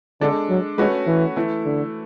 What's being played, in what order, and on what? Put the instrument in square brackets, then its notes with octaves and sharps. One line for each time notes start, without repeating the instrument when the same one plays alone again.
[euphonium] D3 [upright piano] G#3 D4 A4
[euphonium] F#3
[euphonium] G#3 [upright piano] A3 C#4 F#4 B4
[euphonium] E3
[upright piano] E3 A3 E4
[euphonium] D3